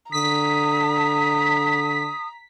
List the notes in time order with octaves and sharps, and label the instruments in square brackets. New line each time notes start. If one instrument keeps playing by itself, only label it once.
[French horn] D3 [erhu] A#5 [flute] D#6 [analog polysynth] B6